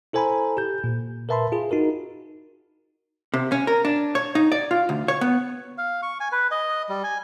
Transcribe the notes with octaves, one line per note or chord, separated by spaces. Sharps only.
E4 A4 C5 G#5 A#5 B5
G4 G6
A#2
A#4 B4 E5 A5 B5 C6
F4 G#4
D#4 F#4 A#4
C3
C#4
A#4
D4
C#5
D#4
D5
F4
D2
C#5
B3
F5
C#6
G#5
B4
D#5
G3
G#5